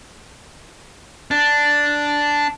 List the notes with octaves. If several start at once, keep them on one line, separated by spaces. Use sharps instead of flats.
D4